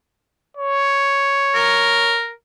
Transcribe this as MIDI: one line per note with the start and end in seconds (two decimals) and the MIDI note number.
0.57 2.18 73
1.55 2.30 70